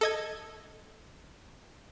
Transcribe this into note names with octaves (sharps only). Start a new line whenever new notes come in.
A4 D#5 G#6